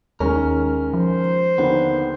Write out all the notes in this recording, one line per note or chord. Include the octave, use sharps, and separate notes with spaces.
D#2 D#3 G#3 C#4 A#4
F3 C5
D#2 D3 D#3 B3